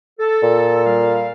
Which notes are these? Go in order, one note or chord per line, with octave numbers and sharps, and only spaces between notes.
A4
A#2
G3 F5